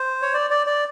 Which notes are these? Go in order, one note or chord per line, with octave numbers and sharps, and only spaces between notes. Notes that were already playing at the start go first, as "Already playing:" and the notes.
Already playing: C5
C#5
D5
D5
D5